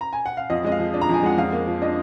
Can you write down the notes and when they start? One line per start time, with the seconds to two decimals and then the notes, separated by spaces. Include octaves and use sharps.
0.01 A#5
0.13 G#5
0.26 F#5
0.37 F5
0.50 F2 D#5
0.65 G#3 D#5
0.72 F5
0.80 F3
0.94 D4
1.01 A#5
1.09 F2 G#5
1.23 G#3 F#5
1.38 F2 F5
1.52 A#3
1.67 F3
1.82 D4 D#5